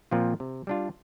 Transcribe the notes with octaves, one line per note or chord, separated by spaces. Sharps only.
A#2 F3 C4 F4
C3
G3 D4 F4